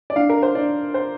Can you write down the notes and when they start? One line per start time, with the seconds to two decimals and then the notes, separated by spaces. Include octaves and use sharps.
0.10 D5
0.16 D4 F5
0.29 A#4
0.43 C5
0.55 D4 D5
0.94 C5